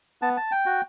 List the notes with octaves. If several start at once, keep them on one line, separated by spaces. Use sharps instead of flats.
B3 A5
A5
G5
F#4